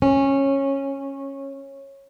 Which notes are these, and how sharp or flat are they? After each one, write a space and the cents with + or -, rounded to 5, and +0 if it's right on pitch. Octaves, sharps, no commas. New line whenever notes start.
C#4 -15